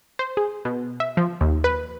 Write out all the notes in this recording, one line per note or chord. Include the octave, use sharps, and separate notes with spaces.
C5
G#4
B2
E5
F3
D#2
B4